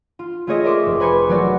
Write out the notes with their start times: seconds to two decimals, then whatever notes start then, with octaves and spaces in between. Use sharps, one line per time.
0.19 F4
0.47 A3 F4 G#4 C#5 D#5 E5
0.64 A#4 D5 E5 C6 D6
0.86 F1
1.00 B4 C5 G#5 B5 C#6 D6
1.29 F#3 A3 F#4 A#4 D5